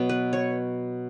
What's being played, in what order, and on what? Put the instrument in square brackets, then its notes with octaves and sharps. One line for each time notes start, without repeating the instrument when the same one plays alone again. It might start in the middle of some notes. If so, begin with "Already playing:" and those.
Already playing: [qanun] B2 F#3 B3
B4
C#5